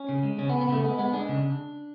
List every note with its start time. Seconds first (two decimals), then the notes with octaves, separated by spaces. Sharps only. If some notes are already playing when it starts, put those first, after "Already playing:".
Already playing: C#4
0.09 C#3
0.23 G#3
0.38 C#3 C#4
0.49 B3
0.54 C#3
0.61 B3
0.68 C#3 A3
0.84 G#3 B3
0.98 G#3 B3
1.13 G#3 D4
1.29 C#3